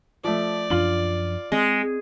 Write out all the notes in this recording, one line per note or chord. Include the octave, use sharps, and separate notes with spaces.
F3 A3 D5
F#2 F3 D4 F4 F#7
G#3 C4